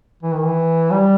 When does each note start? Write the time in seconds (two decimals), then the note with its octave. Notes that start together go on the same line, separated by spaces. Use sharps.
0.23 E3
0.34 D#3
0.45 E3
0.91 G3